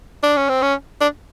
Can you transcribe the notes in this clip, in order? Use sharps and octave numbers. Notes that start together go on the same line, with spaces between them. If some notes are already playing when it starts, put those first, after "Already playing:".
D4
C#4
C4
C#4
D4